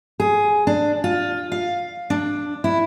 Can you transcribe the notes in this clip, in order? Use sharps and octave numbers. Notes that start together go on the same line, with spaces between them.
G#4
D4
F4
F5
D4
E4